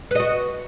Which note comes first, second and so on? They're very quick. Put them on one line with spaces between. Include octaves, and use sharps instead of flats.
B4 D#5 F#4